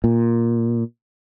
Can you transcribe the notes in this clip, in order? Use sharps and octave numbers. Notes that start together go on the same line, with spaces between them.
A#2